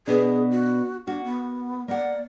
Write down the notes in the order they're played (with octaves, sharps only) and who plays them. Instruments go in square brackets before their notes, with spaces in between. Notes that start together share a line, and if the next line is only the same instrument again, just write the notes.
[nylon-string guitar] B2 B3 D4 [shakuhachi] G#4
[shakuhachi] F#4
[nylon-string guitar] A#3 F#4 [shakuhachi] D4
[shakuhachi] B3
[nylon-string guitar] A#3 F#5 [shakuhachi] D5